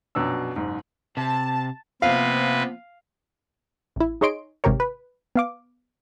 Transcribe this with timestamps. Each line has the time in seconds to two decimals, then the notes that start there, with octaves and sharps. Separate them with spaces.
0.15 A#1 F#2 B2 D4 E6
0.56 F#1 G#2
1.17 C3 A5
2.02 C3 F3 A#3 B3 B4 F5
3.96 A1 E4
4.21 D#4 G#4 C#5 D#5 C6 D7
4.64 G#1 G#2 C3 G4 A#4 C#5
4.80 B4
5.36 B3 F5 D6